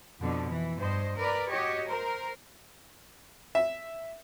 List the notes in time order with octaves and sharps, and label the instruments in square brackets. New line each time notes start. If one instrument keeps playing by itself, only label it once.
[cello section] F2 B2 D3
E3
G2 C5 D#5
A#4 B4 D5
F#4 G4 C#5 D#5
A#4 C5
[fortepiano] E5